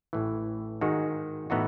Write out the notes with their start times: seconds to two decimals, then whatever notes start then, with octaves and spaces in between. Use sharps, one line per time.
0.13 A1 A2 E3
0.81 G#2 D#3 G#3 D#4 F#4
1.50 A2 E3 B3 D#4 F#4